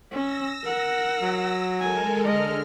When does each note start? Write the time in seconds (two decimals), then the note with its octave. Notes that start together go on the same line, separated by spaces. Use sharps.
0.11 C#4 E6 A#6
0.64 A#4 F#5
1.22 F#3
1.80 G#3 A4 A#4 G#5
2.24 D3 G#3 D#5 F6